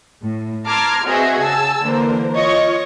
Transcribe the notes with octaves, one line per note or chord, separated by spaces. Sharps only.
A2
A5 A#5 C6 D6 F6 G#6
C4 F#4 G#4 B4 D#5 E5
C#3 G#5 A5 E6
D3 E3 A#3 A#4 C5
F4 C#5 D#5 C#6